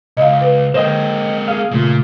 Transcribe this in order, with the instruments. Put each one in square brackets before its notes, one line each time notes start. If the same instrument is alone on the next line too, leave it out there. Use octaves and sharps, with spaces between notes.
[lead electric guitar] C#2 [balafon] D#5 F5
[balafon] B4
[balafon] D3 [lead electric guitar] G#3 A#3 [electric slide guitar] C5 D#5 G5
[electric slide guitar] G#4 F5
[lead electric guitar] A#2 [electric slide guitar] C#3 A3 F4